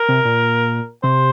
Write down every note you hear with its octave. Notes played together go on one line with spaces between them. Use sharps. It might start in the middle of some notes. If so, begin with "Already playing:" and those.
Already playing: A#4
C3
A#2
C3 C5